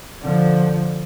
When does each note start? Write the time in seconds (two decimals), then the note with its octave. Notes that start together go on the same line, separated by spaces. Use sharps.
0.22 D3 F3